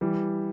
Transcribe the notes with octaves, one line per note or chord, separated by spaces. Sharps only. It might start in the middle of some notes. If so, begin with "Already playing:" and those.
E3 G3